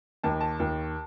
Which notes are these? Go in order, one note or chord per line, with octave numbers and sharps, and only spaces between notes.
D#2 A5
A5
D#2